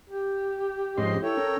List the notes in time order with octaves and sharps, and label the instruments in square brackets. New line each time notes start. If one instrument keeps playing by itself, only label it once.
[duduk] G4
[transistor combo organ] G#2 C#4 C6 [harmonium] F3 D#5
[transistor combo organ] E4 [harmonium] A4 C#5 G5
[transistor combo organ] C#4 A#4